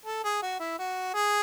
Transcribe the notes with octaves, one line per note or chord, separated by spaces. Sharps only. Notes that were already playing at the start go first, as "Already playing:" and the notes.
A4
G#4
F#4
E4
F#4
G#4